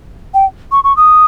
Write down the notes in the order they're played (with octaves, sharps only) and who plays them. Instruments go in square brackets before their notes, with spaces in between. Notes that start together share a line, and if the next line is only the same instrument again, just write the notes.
[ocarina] G5
C#6
C#6
D#6